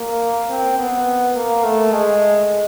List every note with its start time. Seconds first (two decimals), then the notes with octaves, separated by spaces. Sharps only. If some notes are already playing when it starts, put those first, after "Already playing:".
Already playing: A#3
0.50 C4
0.79 B3
1.36 A#3
1.64 A3
1.93 G#3